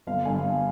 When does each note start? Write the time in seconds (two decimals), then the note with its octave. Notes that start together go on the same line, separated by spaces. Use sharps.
0.07 G1 F5
0.25 G2 D3 G#5
0.44 G1